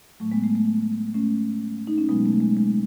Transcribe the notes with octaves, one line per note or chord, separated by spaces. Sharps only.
A2 F#3 A3
G#3 B3
A3
A3
A3 C#4
D#4
C#4
B2 F#3 G#3 B3
A3
G#3
G#3